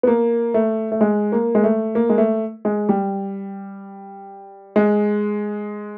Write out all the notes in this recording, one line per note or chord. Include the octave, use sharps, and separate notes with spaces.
B3
A#3
A3
A3
G#3
A#3
G#3
A3
A#3
G#3
A3
G#3
G3
G#3